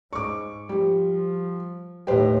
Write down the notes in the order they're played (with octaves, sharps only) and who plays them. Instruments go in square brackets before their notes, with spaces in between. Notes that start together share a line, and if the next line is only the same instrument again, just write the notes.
[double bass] G#2 [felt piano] C#6 D6
[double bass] F3 [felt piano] G3
[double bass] D#2 A2 [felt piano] G4 B4 C5